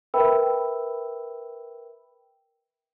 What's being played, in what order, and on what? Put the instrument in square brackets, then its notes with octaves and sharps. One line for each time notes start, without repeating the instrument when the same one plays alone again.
[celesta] A#4 B4 E5 G5 B5 E6